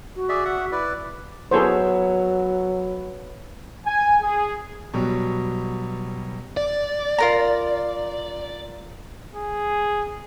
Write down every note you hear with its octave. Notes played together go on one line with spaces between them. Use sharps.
F#4
G#4 D5 E5
E5 F#5
E4 B4 D5
F#3 B3 E4 G#4 A4 C5 C#5
G#5
G#4
B2 F#3 G3
D5
F4 A#4 A#5
G#4